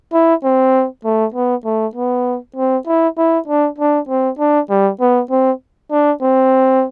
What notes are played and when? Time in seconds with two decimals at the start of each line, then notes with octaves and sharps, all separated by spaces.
0.13 E4
0.44 C4
1.04 A3
1.34 B3
1.65 A3
1.95 B3
2.56 C4
2.87 E4
3.18 E4
3.48 D4
3.78 D4
4.09 C4
4.39 D4
4.70 G3
5.00 B3
5.30 C4
5.91 D4
6.21 C4